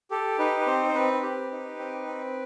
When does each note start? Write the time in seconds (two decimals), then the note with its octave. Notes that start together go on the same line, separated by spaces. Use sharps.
0.11 G4 A4
0.39 D#4 B4
0.61 B4
0.67 C4 C5
0.89 C5
0.94 C4 B4
1.23 G4
1.51 D#4
1.79 C4
2.07 C4